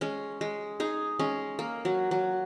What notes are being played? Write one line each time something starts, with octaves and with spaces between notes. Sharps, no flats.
G#3 C#4
G#3
D#4 G#4
G#3 C#4
A#3
F#3
F#3